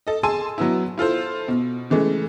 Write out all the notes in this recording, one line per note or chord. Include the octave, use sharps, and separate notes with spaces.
A4 D#5
G#4 G#5 A5 C6 E6 D#7
F#3 B3 E4
E4 F4 A4 C5
B2
C#3 E3 G#3 A3